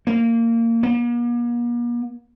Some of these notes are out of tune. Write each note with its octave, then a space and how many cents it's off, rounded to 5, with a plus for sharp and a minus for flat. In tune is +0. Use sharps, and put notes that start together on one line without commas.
A#3 -20
A#3 +45